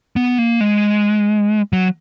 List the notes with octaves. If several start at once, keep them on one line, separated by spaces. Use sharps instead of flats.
B3
A#3
G#3
F#3